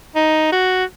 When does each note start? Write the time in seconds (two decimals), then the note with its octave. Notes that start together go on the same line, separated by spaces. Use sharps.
0.15 D#4
0.52 F#4